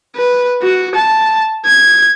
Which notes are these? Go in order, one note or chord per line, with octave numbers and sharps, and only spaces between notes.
B4
F#4
A5
G#6